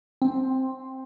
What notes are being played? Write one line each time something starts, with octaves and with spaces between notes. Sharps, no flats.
C4